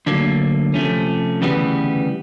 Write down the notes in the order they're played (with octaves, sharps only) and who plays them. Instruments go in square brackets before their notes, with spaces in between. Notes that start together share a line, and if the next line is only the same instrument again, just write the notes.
[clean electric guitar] D2 D3 F#3 A#3
C3 F3 A3 C#4
D2 C#3 E3 G3 B3